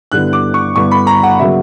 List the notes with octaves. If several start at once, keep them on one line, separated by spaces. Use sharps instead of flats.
G2 D3 G3 B3 E4 F#6
D6
C#6
G2 D3 G3 B3 E4 C#6
B5
A#5
F#5
C#3 F#3 A#3 E5